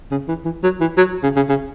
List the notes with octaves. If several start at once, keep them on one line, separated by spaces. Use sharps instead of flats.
C#3
E3
E3
F#3
E3
F#3
C#3
C#3
C#3